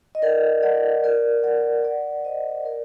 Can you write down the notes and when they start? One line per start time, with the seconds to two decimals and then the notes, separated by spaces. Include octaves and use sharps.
0.15 D#5
0.22 A#4 D5
0.63 D5 F#5
1.04 A#4 D5
1.43 D5 F#5
1.84 D5 F#5
2.25 C5 D#5
2.65 A#4 D5